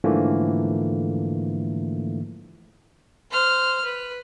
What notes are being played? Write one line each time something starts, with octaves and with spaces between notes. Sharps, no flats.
G#2 D3 E3 F3 A3 A#3
C5 F6
B4